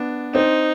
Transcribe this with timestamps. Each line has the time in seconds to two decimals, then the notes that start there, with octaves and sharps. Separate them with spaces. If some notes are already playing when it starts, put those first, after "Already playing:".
Already playing: B3 D4
0.35 C4 D#4